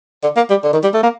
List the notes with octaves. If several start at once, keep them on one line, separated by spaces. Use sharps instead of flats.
D3
A#3
G3
D3
D#3
G3
A3
A#3